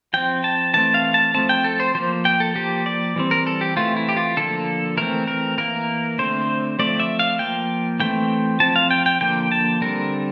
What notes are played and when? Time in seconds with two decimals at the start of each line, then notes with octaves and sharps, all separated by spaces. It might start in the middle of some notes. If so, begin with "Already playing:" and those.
0.14 F3 C4 G5
0.44 A5
0.74 E3 A3 C4 A5
0.94 F5
1.14 A5
1.34 F3 A3 C4 A5
1.49 G5
1.64 A4
1.80 C5
1.95 F3 A#3 C5
2.25 G5
2.40 A4
2.55 F3 A#3 G4
2.86 D5
3.16 E3 G3 C4
3.31 A#4
3.47 A4
3.61 G4
3.76 E3 A3 C4 F4
3.97 E4
4.09 G4
4.17 F4
4.37 D3 F3 A#3 A4
4.97 E3 A3 C4 A#4
5.27 A#4
5.58 E3 A#3 A#4
6.18 D3 A3 C4 C5
6.79 F3 A3 C4 D5
7.00 E5
7.19 F5
7.39 F3 A#3 G5
8.00 E3 A3 C4 G5
8.60 F3 C4 A5
8.76 F5
8.91 G5
9.06 G5
9.21 D3 F3 A#3 G5
9.52 A5
9.81 D3 G3 C4 A#4